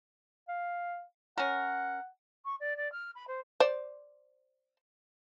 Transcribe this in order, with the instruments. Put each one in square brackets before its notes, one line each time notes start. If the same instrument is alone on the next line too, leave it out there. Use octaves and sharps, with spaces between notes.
[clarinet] F5
[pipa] C#4 A#4 [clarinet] F#5
[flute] C#6
D5
D5
F6
B5
C5
[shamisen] C5 D5